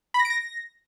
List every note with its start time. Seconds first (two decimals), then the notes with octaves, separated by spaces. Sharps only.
0.14 B5
0.20 A#6
0.25 D7
0.30 A#6